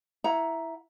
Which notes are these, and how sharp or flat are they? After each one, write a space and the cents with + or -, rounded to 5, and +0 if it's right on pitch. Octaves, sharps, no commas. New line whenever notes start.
E4 +0 F#5 +0 A#5 +10